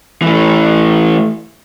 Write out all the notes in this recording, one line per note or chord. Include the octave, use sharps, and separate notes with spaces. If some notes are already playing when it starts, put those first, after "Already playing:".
E3 A3